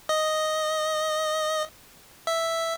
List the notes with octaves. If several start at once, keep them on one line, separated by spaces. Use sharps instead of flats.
D#5
E5